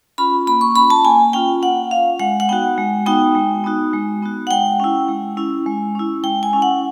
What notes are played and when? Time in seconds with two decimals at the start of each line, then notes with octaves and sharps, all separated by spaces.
0.18 C#4 F4 B5
0.47 A#3 B5
0.61 C#6
0.76 C#4 F4 B5
0.90 A5
1.05 A#3 G#5
1.33 C#4 F4 G5
1.62 A#3 F#5
1.91 C#4 F5
1.95 F4
2.20 G#3 F#5
2.40 F#5
2.49 B3 D#4 F#4 G5
2.78 G#3
3.06 B3 D#4 F#4 G5
3.35 G#3
3.64 B3 D#4 F#4
3.93 G#3
4.22 B3 D#4 F#4
4.47 F#5
4.51 G#3 G5
4.80 C#4 E4
5.09 G#3
5.37 C#4 E4
5.66 G#3
5.95 C#4 E4
6.24 G#3 G5
6.43 G#5
6.53 C#4 E4
6.62 F#5